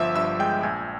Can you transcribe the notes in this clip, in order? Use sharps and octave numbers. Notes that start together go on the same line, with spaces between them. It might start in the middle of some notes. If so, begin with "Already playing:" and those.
Already playing: G1 F3 E5 E6
G2 E5 E6
G#3 G5 G6
A#1 G#5 G#6